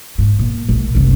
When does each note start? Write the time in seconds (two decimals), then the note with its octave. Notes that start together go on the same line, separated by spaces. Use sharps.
0.18 G#2
0.39 A#2
0.69 A#1
0.95 F#1 C2